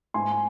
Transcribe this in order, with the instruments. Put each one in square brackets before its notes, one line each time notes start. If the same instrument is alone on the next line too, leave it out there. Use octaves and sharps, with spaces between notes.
[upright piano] G#2 G#5 C6